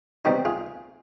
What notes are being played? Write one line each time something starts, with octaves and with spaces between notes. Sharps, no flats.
B2 G3 C4 D#4 G4
F4 G#4